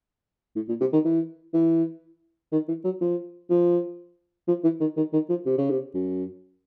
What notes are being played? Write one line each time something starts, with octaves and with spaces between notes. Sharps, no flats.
A2
A#2
C3
D#3
E3
E3
D#3
E3
F#3
F3
F3
F3
E3
D#3
D#3
D#3
F3
C3
C#3
C3
F#2